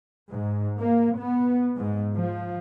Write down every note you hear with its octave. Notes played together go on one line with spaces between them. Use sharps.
G#2
A#3
B3
G#2
F3